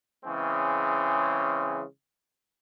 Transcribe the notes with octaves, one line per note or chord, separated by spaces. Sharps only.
C#3 E3 G#3 C4 C#4